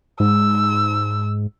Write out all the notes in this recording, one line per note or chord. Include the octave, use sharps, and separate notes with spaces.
G#2 E6